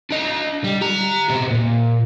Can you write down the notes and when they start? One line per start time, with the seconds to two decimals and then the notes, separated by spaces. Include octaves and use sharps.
0.11 D4 D#5
0.64 G3
0.81 G4 A#5
1.30 B2 C4
1.51 A#2